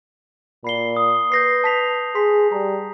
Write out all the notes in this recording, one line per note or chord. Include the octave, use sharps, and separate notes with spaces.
A#2 B5 C7 G7
D#6
B4 G6 A#6 C7
A5 B6 F7
G#4 C6 B6
G3 A#5